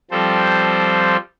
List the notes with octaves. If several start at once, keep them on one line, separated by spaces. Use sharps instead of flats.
F3 G3 C4 A4 C5